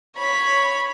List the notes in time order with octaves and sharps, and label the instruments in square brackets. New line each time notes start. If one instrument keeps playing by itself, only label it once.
[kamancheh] C#5 B5